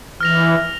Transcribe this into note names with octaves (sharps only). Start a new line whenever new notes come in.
E3 F6 A#6 F7